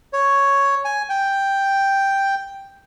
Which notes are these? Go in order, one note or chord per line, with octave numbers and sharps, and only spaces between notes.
C#5
G#5
G5